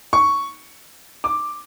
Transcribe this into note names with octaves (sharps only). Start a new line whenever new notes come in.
C#6
D6